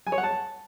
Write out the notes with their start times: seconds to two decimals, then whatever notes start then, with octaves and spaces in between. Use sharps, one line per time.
0.07 G#5
0.12 C#5
0.18 F#5
0.23 A5